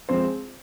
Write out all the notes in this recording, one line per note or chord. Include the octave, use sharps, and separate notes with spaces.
F3 G#3 C4 C5